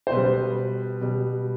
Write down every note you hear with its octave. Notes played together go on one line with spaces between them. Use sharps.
C5
B2 G3 B4
B2 G3